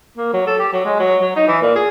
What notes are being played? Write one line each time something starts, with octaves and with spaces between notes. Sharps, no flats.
A#3
F#3
A4
G4
F#3
G#3
F#3
F#3
D#4
E3
A#2
G#4